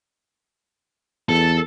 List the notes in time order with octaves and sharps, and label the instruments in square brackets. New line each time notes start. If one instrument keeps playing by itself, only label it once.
[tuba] E2 [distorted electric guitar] A4